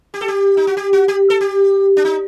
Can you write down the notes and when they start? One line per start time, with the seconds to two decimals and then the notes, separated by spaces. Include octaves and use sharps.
0.14 G4
0.21 A4
0.28 G4
0.57 D#4
0.67 F#4
0.77 G4
0.93 F#4
1.08 G4
1.30 A4
1.41 G4
1.97 D4
2.05 D#4